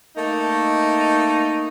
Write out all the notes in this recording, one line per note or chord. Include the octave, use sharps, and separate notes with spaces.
A3 A#3 D#4